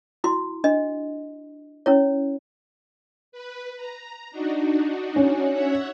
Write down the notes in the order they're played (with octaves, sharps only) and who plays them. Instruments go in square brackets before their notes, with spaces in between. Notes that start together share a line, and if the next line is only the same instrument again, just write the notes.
[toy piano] E4 F#4 C6
D4 D#5
C#4 E4 C#5
[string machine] B4
A#5
D4 D#4 F#4
[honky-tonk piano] C#4
[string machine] C#5 E5 F#5